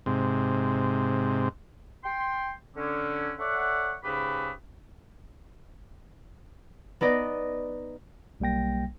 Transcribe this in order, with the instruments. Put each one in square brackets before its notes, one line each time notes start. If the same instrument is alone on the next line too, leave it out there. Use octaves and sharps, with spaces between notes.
[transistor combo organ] G#2 C3
[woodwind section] G5 C6
D3 C#4
A4 C#5 D5 E5 F#5
G#2 C#3 G4 B4 B5
[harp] B3 D#4 D5 D#5
[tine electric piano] B1 G3 A#3 G5 A#6